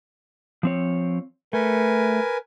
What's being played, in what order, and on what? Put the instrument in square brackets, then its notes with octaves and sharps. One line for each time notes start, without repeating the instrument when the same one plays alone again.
[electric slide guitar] F3 C4 C#5
[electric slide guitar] A3 [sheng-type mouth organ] A#4 B4 G#5